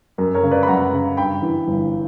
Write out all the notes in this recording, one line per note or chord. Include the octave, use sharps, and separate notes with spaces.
F#2 A#4
A#4 C#5
C#3
B4 D5
B5
F#2 F#5 A#5
C#3
G2 G5 B5
E3
G1